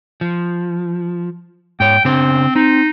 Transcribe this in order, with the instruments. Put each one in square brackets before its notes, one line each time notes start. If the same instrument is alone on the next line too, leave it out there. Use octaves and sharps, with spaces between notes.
[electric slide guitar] F3
[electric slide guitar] G#2 C#5 [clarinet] G5
[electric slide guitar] C#3 D4 C5 [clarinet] C4
[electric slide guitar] C4 [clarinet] D#4